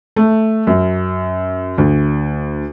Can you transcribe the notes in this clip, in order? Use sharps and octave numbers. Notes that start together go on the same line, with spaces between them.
A3
F#2
D2